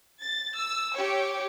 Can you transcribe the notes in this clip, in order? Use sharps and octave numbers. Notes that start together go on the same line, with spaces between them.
A6
E6
G4 C#5